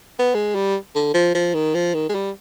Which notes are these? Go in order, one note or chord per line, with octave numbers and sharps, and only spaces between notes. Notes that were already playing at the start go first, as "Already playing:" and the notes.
B3
G#3
G3
D3
F3
F3
D#3
F3
D#3
G#3
G3